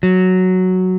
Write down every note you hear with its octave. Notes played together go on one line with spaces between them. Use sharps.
F#3